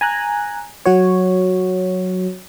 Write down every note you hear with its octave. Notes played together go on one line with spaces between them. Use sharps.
G#5 A#5 F#6
F#3 F#4 C#5